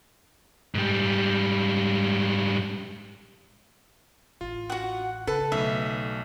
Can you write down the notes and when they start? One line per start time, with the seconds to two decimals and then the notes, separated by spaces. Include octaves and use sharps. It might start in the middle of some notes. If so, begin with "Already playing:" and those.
0.75 G#2 G3
4.41 A1 F4
4.70 F#4 F#5
5.27 C#3 A4 B4
5.52 B1 A3 E5